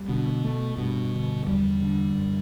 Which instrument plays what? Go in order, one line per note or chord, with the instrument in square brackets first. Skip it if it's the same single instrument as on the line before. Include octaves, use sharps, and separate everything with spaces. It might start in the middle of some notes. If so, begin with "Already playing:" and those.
Already playing: [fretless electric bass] G3
[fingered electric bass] B2 [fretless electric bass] D3
[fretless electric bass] A3
[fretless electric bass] G2 [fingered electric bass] B2
[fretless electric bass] D3
[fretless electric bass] E2 [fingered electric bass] G3
[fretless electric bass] D3
F#2